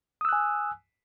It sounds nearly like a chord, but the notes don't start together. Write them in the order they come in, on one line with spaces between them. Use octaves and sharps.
D#6 E6 F#6 G#5